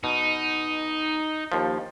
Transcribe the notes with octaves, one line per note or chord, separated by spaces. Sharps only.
B2 D#4
D#2 F3